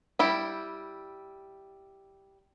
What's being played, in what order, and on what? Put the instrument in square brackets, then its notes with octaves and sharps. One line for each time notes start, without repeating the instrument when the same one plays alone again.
[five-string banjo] G3 E4 G4